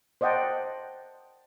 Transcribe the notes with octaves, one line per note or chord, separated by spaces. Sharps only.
C5 D5 D#5 F#5 G5 A5